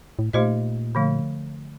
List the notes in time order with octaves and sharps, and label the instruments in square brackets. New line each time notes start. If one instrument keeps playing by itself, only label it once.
[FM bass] A2
[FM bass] A#2 [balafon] A3 D#4 G4 C5 D#5
[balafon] D3 F3 A3